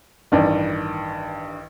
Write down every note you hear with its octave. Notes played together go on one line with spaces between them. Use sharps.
A1 G2 D#3 D5